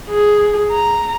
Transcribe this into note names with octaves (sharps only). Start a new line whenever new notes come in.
G#4
A#5